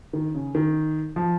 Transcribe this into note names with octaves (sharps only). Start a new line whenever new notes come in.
D#3
C#3
D#3
F3